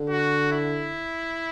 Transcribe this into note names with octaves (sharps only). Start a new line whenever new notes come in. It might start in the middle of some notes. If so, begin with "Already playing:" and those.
Already playing: D3
F#4
E4